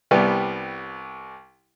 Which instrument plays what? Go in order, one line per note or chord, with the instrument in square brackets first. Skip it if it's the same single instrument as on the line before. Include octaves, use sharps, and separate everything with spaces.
[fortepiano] C2 G3 B3